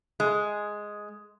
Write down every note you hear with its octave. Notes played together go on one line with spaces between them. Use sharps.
G#3